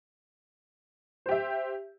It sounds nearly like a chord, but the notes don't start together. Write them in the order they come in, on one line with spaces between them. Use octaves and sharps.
C5 G4 E5